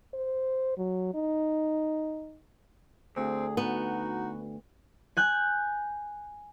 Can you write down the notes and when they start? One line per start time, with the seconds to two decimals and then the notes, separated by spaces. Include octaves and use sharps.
0.13 C5
0.77 F#3
1.14 D#4
3.16 D2 C4 G#4
3.57 B3 D#4 F#4
5.17 G#5 F#6 G6